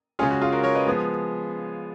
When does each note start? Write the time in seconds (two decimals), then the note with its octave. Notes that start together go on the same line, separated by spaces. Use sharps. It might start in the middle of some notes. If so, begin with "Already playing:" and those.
0.19 C#3 G#3 C#4 F4 G#4
0.30 F#4
0.41 F4 G#4
0.52 F#4 A#4
0.64 A#4 C#5
0.75 B4 D#5
0.87 F3 G#3 B3